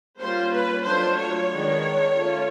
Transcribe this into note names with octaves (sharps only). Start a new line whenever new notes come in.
G3 A#3 C#4 F4 C5
B4
F#3 A3 D4 F4 C5
C#5
D#3 G#3 B3 D4
A3 C#4 F4